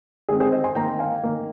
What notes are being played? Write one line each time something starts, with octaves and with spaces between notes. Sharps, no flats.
D#3 G#3 C4 G#4
G#4 C5
C5 D#5
G#5 C6
D#3 A#3 G5 A#5
F5 G#5
D#3 A#3